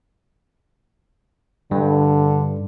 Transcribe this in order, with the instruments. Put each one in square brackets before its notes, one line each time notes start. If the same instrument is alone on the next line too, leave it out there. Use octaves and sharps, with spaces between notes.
[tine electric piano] G2 [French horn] D3